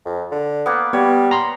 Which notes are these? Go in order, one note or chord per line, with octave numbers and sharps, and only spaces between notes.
F2
D3
A#3 B3
G3 B3 C#5
A#5 C6